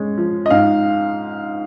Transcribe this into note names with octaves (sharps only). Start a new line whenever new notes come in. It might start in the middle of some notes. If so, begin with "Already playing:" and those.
Already playing: G#3 C#4
F3
D#5
G#2 F5